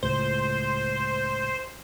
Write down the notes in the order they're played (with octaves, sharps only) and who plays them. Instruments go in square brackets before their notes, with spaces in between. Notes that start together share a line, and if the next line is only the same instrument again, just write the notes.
[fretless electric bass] C#2 A2 [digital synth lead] C5